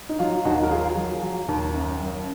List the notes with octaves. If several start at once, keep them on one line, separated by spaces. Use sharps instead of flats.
D#4
F#3 F4
D#2 D#4 F#4
A#4
F#3 F4 G#4
F#3
F#3
D#2
F#2
F#2